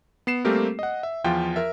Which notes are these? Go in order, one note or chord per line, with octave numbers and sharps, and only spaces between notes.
B3 C7 E7
G3 A3 A#3 C4 G4 A#4
D#5 F#5
E5
E2 F3 F4 G5
A#4 E5